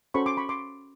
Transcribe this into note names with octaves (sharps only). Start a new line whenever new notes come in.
C#4 F#4 A4 C5 B5 C#6
C6 D6
B5 C#6
C6 D6